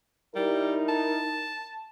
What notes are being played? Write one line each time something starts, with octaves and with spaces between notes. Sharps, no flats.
G3 D#4 E4 A#4
A5